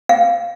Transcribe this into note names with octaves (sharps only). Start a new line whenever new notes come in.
F5